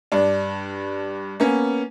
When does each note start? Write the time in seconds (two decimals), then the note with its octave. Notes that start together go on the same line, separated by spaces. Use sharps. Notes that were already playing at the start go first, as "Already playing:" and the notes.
0.12 G2 D4
1.40 A#3 B3 C#4